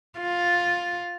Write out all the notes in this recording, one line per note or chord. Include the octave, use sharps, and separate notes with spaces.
F4